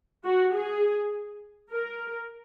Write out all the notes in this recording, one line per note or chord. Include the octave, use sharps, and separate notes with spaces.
F#4
G#4
A#4